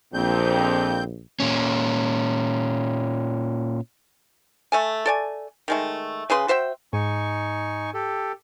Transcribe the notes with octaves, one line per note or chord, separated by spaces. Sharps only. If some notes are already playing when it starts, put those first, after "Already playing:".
A#1 F2 A#2 C4 G6
A#2 C#4
A3 A4 G#5
A4 D5 G#5
D#3 G#3 A3
C#3 G#4 B4 C6
F#4 C5 E5 G5
G#2 D#4 G#5 C#6
G4 A4